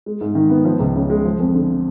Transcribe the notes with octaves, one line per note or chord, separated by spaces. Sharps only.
G#3
G#2
D#3
B3
F3
C#2
C#3
G#3
F3
F2
D3